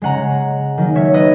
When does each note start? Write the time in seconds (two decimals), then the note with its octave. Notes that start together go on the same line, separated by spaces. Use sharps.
0.02 C#3 G#3 C#4 F#5 A#5
0.78 D#3 F#3 A#3 D#4
0.96 C#5 E5
1.14 B4 D#5